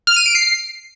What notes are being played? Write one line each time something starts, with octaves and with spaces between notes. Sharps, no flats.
F6
D#7
D7
C7